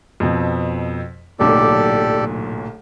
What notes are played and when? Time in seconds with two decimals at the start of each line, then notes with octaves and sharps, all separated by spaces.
0.20 F2 B2
1.40 D1 B1 A#2 G4 A4 D5